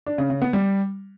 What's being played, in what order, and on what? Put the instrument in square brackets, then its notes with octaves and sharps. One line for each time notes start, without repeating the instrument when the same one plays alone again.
[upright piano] D4
C#3
C#3
B3
G3